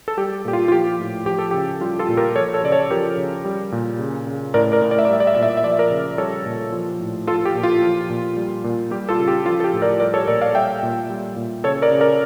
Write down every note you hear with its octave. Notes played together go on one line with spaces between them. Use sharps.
A4
G3 G4
A#2 G4
F4
F4
F3 G4
A2
F3 G4
A4
C#3 G4
G3 F4
F4 A4
A#2
G4 A#4
F3 A4 C#5
A4 C#5
C#3 D5
A4 C#5
F3 G4 A#4
C#3
G3
A#2
C#3
C#3
A2 A#4 D5
A#4 D5
A2
D5
E5
D5
G3 E5
D5
E5
A#2 D5
E5
D5
E5
F3 D5
E5
A#4 D5
C#3
G3 A4 C#5
A#2
F3
A2
F3 F4 A4
G4
A#2
F4
F3
A#2
G3
A#2
G3 G4
F4 A4
C#3
G4
F3 F4
A4
G4
A2
A#4 D5
G3 A#4 D5
A4 C#5
A#2 A#4 D5
D5 F5
G3 E5 G5
A#2
G3
A#2
C#3 A4 C#5
A#4 D5
C#3
A#4 D5